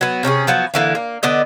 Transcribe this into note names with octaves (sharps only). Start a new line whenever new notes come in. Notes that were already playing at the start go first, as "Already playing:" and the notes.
F#3 B3
C3 C#4 F#4 G#4
F3 F#3 B3
D3 E3 A#3
A#3
D3 B3 D5 D#5